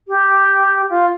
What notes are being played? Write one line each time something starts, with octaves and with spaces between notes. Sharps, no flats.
G4
F4